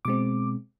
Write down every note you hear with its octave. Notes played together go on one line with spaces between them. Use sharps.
B2 G#3 C4 D6